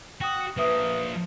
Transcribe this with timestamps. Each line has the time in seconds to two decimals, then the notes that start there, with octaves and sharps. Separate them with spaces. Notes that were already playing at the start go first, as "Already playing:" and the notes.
0.21 F#4 G5 D#6
0.57 F3 A#3 B4 E5 D#6